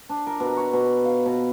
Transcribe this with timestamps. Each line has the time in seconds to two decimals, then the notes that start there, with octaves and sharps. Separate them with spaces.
0.09 D4
0.27 A#4
0.40 B2
0.57 C#5
0.73 B2
1.05 F5
1.26 B2